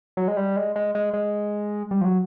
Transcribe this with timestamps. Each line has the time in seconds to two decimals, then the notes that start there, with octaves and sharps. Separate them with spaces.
0.17 F#3
0.28 G#3
0.37 G3
0.56 G#3
0.76 G#3
0.95 G#3
1.14 G#3
1.91 G3
2.01 F3
2.05 F#3